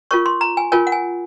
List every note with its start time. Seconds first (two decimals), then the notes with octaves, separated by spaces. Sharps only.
0.11 F4 A#4 C#5 C#6
0.26 C6
0.41 A#5
0.57 G#5
0.72 F4 A#4 C#5 G#5
0.87 F#5
0.92 G#5